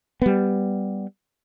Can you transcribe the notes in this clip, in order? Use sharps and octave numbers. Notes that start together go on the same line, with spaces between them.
G3 B3